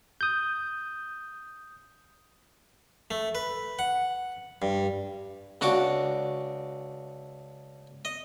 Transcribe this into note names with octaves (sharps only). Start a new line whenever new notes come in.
D#6 G6
A3
B4
F#5
G2
C#2 D4 F#4 D6
D#5